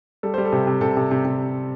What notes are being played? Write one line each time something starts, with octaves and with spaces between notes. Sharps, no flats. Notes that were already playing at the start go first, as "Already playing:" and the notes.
G3 A4
G3 C5
A4
C3
C3
C3 A4
C3
C3
C3